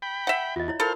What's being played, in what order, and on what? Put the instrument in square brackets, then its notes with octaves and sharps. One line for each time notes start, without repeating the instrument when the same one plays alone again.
[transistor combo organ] G5 B5
[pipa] E5 F#5
[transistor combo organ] E2 [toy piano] F4 D#5
[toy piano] E4 C#5
[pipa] A4 [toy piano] A#4 A#5 B5 [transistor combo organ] C5 F5 F6